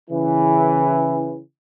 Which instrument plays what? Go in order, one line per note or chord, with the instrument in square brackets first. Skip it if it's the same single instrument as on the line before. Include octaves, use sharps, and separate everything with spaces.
[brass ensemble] C#3 E3